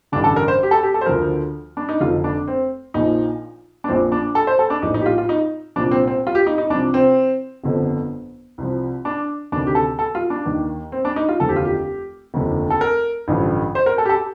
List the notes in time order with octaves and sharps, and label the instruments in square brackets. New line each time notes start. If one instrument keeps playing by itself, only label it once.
[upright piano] A1 G2 D3 D4
A4
A#4
C5
G4
A4
G4
A4
C5
D2 D3 F3 A#4
D4
D#4
F1 F2 D3 F4
D4
C4
A#1 A#2 F3 D#4
D4
A#1 A#2 F3 C4
D4
A4
C5
A4
D4
A#1 A2 F3 D#4
D#4
G4
F4
F4
D#4
C2 A#2 F3 D4
C4
C4
F4
G4
D#4
D#4
C2 C3 F3 D4
C4
G1 F2 D3 F3
C2 C3 F3
D4
D2 C3 D#3 D4
G4
A4
A4
F4
D4
D#2 D#3
C4
D4
D#4
F4
F1 D#2 D3 F3 A4
G4
F4
G4
F1 D#2 D3 F3
A4
A#4
A1 G2 D3 F3
C5
A#4
A4
G4
A4